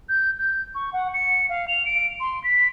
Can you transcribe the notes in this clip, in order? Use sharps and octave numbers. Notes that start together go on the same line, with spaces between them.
G6
G6
C#6
F#5
C#7
F5
F7
D7
C6
B6